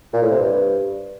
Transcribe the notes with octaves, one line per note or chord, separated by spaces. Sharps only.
A#2
A2
C3
G2